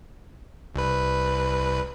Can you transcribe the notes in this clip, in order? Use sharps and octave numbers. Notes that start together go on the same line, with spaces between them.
C2 B4